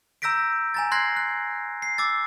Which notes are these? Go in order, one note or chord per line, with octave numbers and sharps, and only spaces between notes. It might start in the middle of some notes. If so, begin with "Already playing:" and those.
A#5 E6 G6 A#6 B6 D7
G#5 A#5 A6
C6 F#6 G#6 A#6 C7
F#6
C7
D6 E6 A6